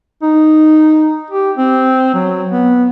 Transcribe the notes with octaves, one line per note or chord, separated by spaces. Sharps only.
D#4
G4
C4
F#3
B3